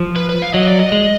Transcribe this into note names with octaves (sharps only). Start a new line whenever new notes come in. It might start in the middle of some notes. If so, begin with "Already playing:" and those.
Already playing: F3
B4
B4
F5
F#3 D#5
D5
D#5
G#3